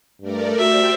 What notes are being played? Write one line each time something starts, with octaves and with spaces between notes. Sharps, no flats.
G2 A3 A#4 D5
F#4 G4 C5 D5 E5